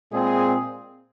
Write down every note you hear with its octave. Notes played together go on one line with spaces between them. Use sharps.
A#2 G#3 C4 G#4